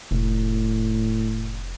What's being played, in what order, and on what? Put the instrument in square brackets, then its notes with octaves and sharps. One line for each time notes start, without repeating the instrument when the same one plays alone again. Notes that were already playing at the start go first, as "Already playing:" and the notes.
[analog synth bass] F1 [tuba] A2